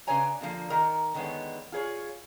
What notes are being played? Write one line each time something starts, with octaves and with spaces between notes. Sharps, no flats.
C#3 D4 B4 C#5 G#5 A#5
B2 D3 F3 A#3
D#3 A#4 A#5
D3 D#3 G#3 B3 C#5
F4 G#4 C5 C#5